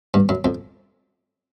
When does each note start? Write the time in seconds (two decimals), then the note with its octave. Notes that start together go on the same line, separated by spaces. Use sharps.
0.14 G2
0.29 F#2
0.45 F2